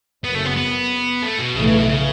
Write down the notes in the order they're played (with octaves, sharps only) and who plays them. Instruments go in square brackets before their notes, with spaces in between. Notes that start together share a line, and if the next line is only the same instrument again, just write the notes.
[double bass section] F#1 F#2 C#3 [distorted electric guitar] B3
[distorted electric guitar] A3
B3
B3
A3
B2
[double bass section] B1 A2 E3 A3 [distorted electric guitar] C#3
[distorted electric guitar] C#3
B2
C#3